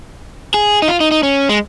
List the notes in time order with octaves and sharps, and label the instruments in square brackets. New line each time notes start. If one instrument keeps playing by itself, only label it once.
[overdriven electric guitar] G#4
D#4
F4
D#4
D#4
C#4
G#3